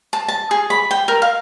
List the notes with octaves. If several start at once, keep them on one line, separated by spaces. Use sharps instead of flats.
A5
A5
G#4
B5
G5
A#4
F5